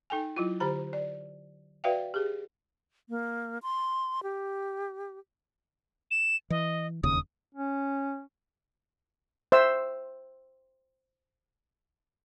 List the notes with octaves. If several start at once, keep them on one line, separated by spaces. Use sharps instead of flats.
D#4 A4 G5 G#5
F#3 E4 F4
D3 G4 C5 A#5
D5
F#4 B4 D5 E5 F5 G5
G4 G#4
A#3
C6
G4
E7
E3 D#5
E1 D#2 C#3 D#6
C#4
C5 E5 E6